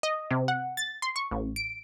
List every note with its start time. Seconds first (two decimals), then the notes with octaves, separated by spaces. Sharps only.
0.03 D#5
0.31 C3
0.48 F#5
0.77 A6
1.02 C6
1.16 C#6
1.31 A1
1.56 D7